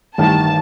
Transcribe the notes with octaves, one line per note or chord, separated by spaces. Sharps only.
A1 G2 D#3 A5